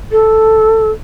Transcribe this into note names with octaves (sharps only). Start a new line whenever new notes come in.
A4